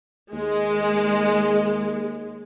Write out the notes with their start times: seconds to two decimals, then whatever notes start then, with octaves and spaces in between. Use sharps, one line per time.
0.33 D#2 G#3